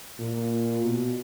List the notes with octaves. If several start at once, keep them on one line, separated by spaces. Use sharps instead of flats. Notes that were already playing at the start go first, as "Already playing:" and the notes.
A#2
B2